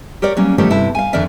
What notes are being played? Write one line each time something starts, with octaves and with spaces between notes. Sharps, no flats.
G4 A#4 C#5 D5
F#3 G3 A#3 C#4
D#3 F3 A3 B3 G4 C#5
G2 C3 E4 A4 A5
F5 G#5
F2 D3 D#3 A#4 D5 E5